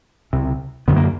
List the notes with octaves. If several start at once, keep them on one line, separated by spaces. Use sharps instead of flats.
C#2 C3
F#2 D3 B3
A#3